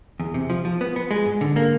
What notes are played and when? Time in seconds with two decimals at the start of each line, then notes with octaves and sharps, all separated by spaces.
0.20 E2
0.34 C3
0.50 F3
0.65 F3
0.81 B3
0.96 B3
1.11 G#3
1.26 G#2
1.41 D3
1.56 A#3